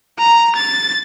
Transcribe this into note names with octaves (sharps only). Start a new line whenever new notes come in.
A#5
A6